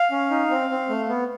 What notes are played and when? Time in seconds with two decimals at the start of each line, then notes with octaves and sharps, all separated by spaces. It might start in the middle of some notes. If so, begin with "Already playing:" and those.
Already playing: F5
0.11 C#4
0.31 D#4
0.50 C4
0.69 C4
0.89 A3
1.08 B3